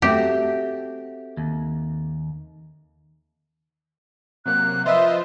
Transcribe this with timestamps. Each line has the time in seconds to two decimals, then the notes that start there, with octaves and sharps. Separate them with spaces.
0.02 A3 C4 F#4 G4
1.37 D#2
4.46 C3 F#3 A#3 F#6
4.86 F3 F4 B4 C5 D#5 E5